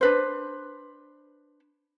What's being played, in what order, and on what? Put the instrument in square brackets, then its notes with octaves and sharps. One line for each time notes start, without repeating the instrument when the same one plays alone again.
[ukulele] D4 B4 C5